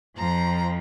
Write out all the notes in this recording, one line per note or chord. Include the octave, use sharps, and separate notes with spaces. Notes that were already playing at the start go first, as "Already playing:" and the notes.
F2 F3 A#5